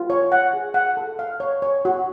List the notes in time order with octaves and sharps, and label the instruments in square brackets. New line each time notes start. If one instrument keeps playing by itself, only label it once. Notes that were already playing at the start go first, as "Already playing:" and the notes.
Already playing: [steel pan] F4
C#5
F#5
G#4
F#5
A4
F5
C#5
C#5
F#4